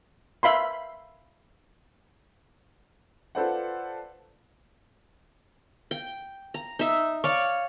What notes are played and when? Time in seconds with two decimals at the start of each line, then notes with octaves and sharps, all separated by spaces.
0.43 E5 F5 B5 C6
3.35 F4 A4 B4 C5 D5 F#5
5.91 G5
6.54 A#5
6.79 D#4 E5
7.24 C#5 D5 F5